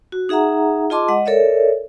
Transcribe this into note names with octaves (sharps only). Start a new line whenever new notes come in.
F#4
D#4 G#4 E5 F#5 A#5
F4 G#4 D#5 A5 C6 D6
G#3 D#5 F#5
A4 A#4 C#5 D5 E5